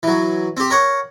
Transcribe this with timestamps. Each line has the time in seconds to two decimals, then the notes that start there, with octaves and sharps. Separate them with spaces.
0.03 E3 F#3
0.57 C4 G4
0.70 A#4 C#5 F#5